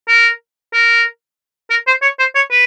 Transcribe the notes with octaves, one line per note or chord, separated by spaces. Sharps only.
A#4
A#4
A#4
C5
C#5
C5
C#5
B4